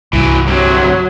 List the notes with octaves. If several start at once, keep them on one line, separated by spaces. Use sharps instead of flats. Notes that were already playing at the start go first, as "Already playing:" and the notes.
C2 G2 E3 F#3
D2 C3 F#3